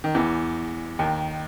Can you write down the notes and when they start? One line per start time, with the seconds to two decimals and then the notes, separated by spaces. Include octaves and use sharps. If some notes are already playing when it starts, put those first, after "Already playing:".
0.04 D#3
0.15 E2 E3
0.99 D#2 D#3